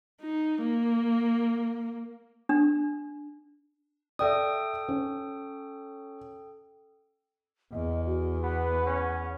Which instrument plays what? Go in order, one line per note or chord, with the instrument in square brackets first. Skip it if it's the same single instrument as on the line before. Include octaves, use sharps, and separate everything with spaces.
[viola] D#4
A#3
[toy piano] D4
[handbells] A4 G5 D#6 [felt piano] D5 E5
[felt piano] C#4
[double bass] E2 [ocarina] D#5
[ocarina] F#4
[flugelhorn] B3 [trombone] B4 [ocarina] F#5
[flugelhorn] C#4